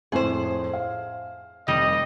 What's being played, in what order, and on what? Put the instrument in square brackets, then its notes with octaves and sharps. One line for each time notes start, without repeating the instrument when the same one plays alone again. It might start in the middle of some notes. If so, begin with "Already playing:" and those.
[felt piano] F2 A2 [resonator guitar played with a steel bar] G#4 C5
[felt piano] F5
[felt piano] F1 [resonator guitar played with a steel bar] G3 [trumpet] D#5